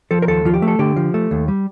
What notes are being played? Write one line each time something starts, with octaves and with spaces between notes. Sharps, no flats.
F3 A4
A#4
D#2 A4
F3 F4
G4
A3
A4
D3 G4
F3
A3
D#2
G3